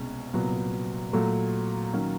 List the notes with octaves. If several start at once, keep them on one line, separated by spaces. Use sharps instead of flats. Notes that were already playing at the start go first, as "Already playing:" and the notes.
Already playing: C2 B2 G#3 C#4
C2 A#2 F#3 B3
A#2 F#3 A3
D#3 F#3 A#3 C#4